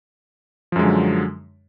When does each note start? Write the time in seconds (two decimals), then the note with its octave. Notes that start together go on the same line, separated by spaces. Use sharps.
0.72 F3
0.76 F#2
0.79 G#3
0.83 D3
0.86 F#3